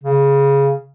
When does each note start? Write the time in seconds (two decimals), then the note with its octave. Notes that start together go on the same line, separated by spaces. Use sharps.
0.04 C#3